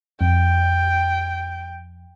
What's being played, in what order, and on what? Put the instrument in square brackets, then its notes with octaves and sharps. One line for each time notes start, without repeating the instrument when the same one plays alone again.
[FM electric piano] F2 [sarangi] G5